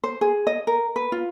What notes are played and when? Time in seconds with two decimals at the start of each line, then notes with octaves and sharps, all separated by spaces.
0.04 C5
0.21 G#4
0.47 D#5
0.67 A#4
0.96 B4
1.12 F4